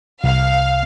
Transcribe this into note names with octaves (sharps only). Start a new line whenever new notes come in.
C2 F5